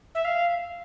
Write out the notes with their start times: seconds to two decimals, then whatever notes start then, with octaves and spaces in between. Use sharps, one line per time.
0.15 E5
0.25 F5